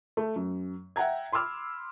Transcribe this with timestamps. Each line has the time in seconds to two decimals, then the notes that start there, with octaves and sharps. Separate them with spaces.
0.17 A3
0.36 F#2
0.96 E5 F#5 G5 A#5 G#6
1.32 B5 C6 D6 E6 F6